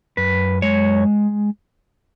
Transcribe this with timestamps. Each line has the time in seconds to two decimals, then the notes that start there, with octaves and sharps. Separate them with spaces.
0.17 F#2 B4
0.62 G#3 C#5